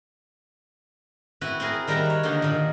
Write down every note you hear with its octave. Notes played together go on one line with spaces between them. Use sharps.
C4 E4 F#4 B4
C4 E4 G#4 A#4
D#3 G3 C4 A#4 E5 F#5
C#5 F#5
D3 D#3 A#3 D#4 C5
A#2 D#3